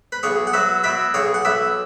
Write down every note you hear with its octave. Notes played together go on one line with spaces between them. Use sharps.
B4
B1 G#4 C#5
F#5
F#3 B4 E5
B2 B4 E5
B1 G#4 C#5
F#5
B1 B4 E5